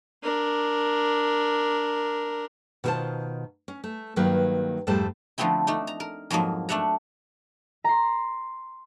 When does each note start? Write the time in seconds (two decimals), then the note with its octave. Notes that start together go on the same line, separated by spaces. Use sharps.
0.23 D4 A#4
2.84 B2 D#3 E4 F4 C5 A5
3.68 C#4
3.84 A3
4.16 G2 D#3 F#3 A#3 B4
4.87 F2 G#2 G3 A3 C5 A5
5.38 D3 F3 A3 B3 C4 E4
5.67 A3 D4 D#4
5.87 A#5
6.00 A#4
6.30 F2 G#2 F3 F#3 A#3
6.69 A3 D4 E5 F#5 A#5
7.84 A#5 C6